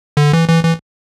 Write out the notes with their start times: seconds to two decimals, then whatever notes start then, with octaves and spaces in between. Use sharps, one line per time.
0.17 D3
0.33 E3
0.48 E3
0.63 E3